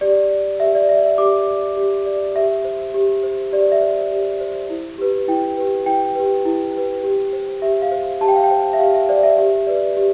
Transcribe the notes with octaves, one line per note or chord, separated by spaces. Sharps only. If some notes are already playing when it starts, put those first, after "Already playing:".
G4 D5
D5
G4 E5
D5
D5 E5
E5
G4 D6
D5
G4
D5
G4 E5
C5
G4
C5
G4 D5
E5
C5
G4
C5
E4
G4 B4
E4 G5
G4 B4
E4 G5
G4 B4
E4
G4 B4
G4
C5
G4 E5
F5
C5
G4 A5
G5
F5
G5
C5
E5
G4 F5
E5
C5 D5
E5
G4
B4 D5
G4